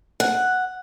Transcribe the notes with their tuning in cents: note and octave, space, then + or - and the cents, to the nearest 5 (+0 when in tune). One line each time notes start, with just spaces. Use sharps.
F#5 +0